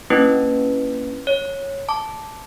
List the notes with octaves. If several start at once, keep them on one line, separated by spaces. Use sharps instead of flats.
A#3 C#4 D4 E4 B4
C#5
A5 D6